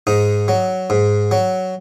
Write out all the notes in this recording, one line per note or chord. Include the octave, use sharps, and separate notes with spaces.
G#2 D#4
F#3
G#2
F#3